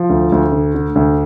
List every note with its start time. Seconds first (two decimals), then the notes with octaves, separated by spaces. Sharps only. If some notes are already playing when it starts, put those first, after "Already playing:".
Already playing: F3
0.09 D2
0.32 D2
0.52 D3
0.75 D3
0.95 D2